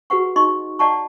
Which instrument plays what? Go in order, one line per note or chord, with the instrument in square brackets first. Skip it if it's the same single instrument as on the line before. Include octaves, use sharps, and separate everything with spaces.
[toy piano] F#4 G#4 B4 F#5 C#6
D#4 D#5 C6 C#6
D5 D#5 F#5 A5 A#5 C#6